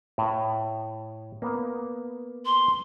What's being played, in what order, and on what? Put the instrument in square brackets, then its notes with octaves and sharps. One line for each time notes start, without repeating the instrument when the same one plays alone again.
[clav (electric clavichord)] A2
A#3 B3
[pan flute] C6